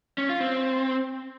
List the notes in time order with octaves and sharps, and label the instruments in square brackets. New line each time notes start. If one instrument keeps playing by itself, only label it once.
[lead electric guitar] C#4
F4
C4